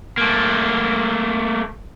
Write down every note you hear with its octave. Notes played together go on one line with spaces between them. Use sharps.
A3 A#3